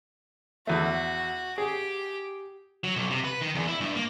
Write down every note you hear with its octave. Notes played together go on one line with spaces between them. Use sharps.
E2 A3 F#4
G4 G#4
F#3
B1
C3
B4
D#3
E2
E4
G2
A#3